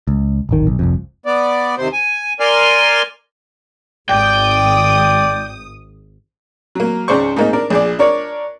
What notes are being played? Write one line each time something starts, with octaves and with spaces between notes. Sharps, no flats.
C#2
D1 G#1 D#3
B1
F1 C2 F2
B3 D5
D#2 C3 C5
G#5
A#4 D5 G#5 C6 F6
G#1 D5 G5 D#6
F#3 A#3
C#2 G#2 C#3 C5 D5 C#6
G#2 A#3 D#4
D4 A#4 D5
A#1 G#4 D5
D4 A#4 C#5 D5